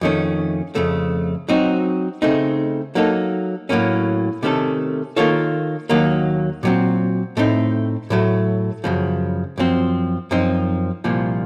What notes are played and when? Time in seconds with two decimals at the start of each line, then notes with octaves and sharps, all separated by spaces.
0.01 F2 D#3 A3 C#4
0.75 F2 C#3 A3
1.48 F#3 C4 D#4 F#4
2.22 C#3 A3 C4 D#4
2.95 F#3 A#3 D#4 A4
3.69 A2 F#3 A#3 C#4
4.43 C3 D#3 A3 C#4 A4
5.16 D#3 A#3 F4 A4 C#5
5.89 D#2 D#3 F#3 A#3
6.63 A#2 F#3 C4
7.37 A2 A3 C4 D#4
8.10 A2 F#3 A3
8.84 F#2 C#3 F3
9.58 F#2 F3 C4
10.31 F#2 F3 C4 D#4
11.04 C2 A#2 F3